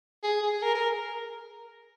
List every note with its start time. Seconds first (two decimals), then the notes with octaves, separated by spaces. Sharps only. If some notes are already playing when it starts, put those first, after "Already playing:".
0.24 G#4
0.43 G#4
0.62 A#4
0.75 A#4